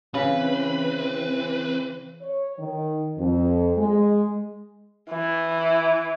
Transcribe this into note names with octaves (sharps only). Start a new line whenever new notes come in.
C#3 E3 C4 B4
C#5
D#3
F2
G#3
E3